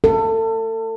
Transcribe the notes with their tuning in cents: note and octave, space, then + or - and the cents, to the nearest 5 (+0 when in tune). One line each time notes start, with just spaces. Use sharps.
A4 +30